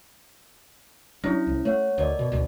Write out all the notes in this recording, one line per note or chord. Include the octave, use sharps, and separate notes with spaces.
F#3 C#4 D4 E4
C2
A3 C#5 F#5
D2 A#4 D5 D#5
B2
A1 D2 B2